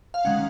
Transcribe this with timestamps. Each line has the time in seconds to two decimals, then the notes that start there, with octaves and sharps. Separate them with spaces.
0.14 F5
0.25 D#3 G#3 C#4 F#5